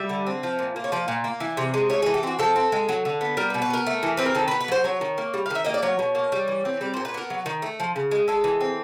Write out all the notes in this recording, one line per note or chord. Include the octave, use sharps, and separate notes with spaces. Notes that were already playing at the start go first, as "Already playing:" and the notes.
Already playing: G3 E5
D3
C4
F3
A#2
A#3
C#5
F3 D5
A#2
A#3
E3
C3
G#3
A3 C#5
E3 G#4
G4
C4 F#4
F3 A4
C4
G#3
F#3
D3
B3
G3 A#4
B4
B2
B4
B3 A#4
A3
E3
C4 B4
A#4
D#3 A4
B3 B4
B4
F#3 C5
F#3 C#5
D#3
A#3
G3
F5
D#3 E5
A#3 D#5
D5
F#3 C#5
B2
A#3
G3
E3
C4
G3 D5
A#2 C5
B4
B3 A#4
F#3
D#3
A3
F3
C#3
G#3
G#3 A4
E3
C4